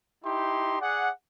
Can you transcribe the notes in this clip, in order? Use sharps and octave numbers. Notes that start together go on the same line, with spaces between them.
D#4 E4 G4 C6
G#4 D5 F#5